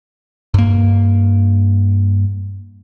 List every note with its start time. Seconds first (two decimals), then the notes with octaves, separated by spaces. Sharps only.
0.54 G2 A#3